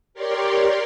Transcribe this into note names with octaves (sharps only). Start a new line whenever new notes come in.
G4 A#4 C#5 D5 C6